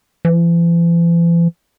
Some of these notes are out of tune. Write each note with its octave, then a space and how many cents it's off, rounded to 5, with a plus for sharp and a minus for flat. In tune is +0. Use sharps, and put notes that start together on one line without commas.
E3 +45